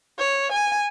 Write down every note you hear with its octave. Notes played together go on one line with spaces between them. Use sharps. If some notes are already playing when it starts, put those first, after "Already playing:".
C#5
G#5